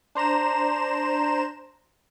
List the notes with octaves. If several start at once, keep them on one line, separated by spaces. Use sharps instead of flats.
D4 C5 A#5 E7